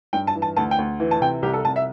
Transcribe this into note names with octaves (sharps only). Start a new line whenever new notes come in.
G2 G5
A5
E3
A5
D2 A5
G5
D2
E3
A5
C3 G5
C2 G4
A4
C2 A5
E5